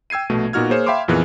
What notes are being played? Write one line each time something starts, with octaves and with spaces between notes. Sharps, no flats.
G5 E6 G#6 C7 D#7
A#1 B2 A3
A#2 B3 D#4 F#4 F6 G#6
A#3 G#4 C5 C#5 E7
E5 F5 G5 B5 C6 D6
F2 A#2 E3 B3 G#4 F#6